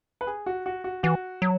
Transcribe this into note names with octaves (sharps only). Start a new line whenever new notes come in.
B4
G#4
F#4
F#4
F#4
E3 F#4
F#3